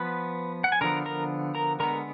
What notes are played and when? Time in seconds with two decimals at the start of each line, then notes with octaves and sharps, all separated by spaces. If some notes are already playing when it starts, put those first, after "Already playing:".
Already playing: F3 B3 B4 B5
0.64 F#5
0.72 G#5
0.81 D3 F3 B3 A#4 A#5
1.06 A#4 A#5
1.55 A#4 A#5
1.80 D3 G#3 B3 A#4 A#5